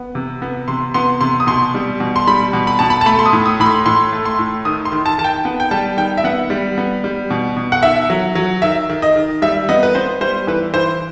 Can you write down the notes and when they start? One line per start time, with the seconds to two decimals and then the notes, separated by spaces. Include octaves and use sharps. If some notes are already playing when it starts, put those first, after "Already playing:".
Already playing: B3
0.15 C3
0.42 B3
0.68 C3 C6
0.94 B3 C6
1.21 C3 C6
1.40 D#6
1.47 B2 C6
1.75 G3
2.00 B2
2.16 C6
2.27 G3 B5
2.53 B2
2.67 B5
2.79 B2 A5
2.90 B5
3.01 A5
3.06 A3 B5
3.19 C6
3.26 D#6
3.33 A2
3.46 D#6
3.60 A2 B5
3.66 C6
3.86 A2 C6
4.13 A3
4.25 C6
4.39 A2
4.65 D#3 D#6
4.85 C6
4.92 D#3
5.06 A5
5.18 D#3 A5
5.24 G5
5.45 B3
5.60 G5
5.71 G3 A5
5.97 D#3 G5
6.18 E5
6.24 B3 F#5
6.50 G3
6.78 B3
7.04 G3
7.30 B2
7.57 B2
7.72 F#5
7.83 D#3 E5
8.10 F#3
8.35 F#3
8.62 D#3 E5
8.89 D#3
9.02 D#5
9.16 D#3
9.42 G3 E5
9.69 B3 D#5
9.83 B4
9.95 B3 C5
10.21 G3 C5
10.47 E3 B4
10.74 E3 C5